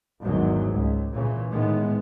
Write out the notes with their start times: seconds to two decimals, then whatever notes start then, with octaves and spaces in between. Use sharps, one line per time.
0.21 G#1 E2 G#2 F#3
0.73 C#2
1.13 A#2 C#3 E3
1.50 A2 D#3 G#3 B3